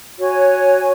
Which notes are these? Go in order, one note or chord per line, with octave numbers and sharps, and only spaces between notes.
F#4 C#5 G#5